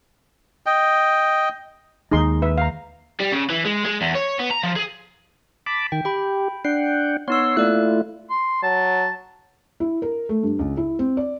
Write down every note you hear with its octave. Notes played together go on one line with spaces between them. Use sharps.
D#5 G5
D#2 G#3 D#4 G#4 C6
B4 E5
F5 A#5
G3
C#3
E3
G#3
G#3
E2
C#5
B3
A#5
F3
G#4
A5 B5 D6 B6
D#3 G5
G4 G5 B5
D4 F#5 G5 C7
B3 D#4 C#5 C6 E6
A3 A#3 E4 F4 D5 F#6
C6
F#3 A5
E4
A#4
A3
G2
C#2
E4
C4
D5